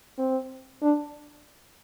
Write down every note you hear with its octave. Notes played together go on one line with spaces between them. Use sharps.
C4
D4